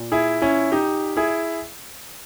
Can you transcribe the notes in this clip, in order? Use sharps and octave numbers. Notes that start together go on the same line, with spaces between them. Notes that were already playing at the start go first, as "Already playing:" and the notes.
Already playing: A#2
E4 G#4
C#4 E4
D#4 G4
E4 G#4